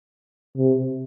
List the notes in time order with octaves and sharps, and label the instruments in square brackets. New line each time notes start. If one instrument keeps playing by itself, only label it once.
[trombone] C3